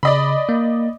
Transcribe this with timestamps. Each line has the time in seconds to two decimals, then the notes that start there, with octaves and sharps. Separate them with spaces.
0.03 C#3 D5 D#5 B5
0.49 A#3